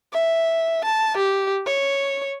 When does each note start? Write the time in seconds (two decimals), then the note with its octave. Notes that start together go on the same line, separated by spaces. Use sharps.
0.13 E5
0.84 A5
1.17 G4
1.66 C#5